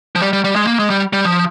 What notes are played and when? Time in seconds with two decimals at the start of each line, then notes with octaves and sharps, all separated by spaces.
0.15 F3
0.22 G3
0.33 G3
0.44 G3
0.56 G#3
0.67 A#3
0.79 G#3
0.90 G3
1.13 G3
1.25 F3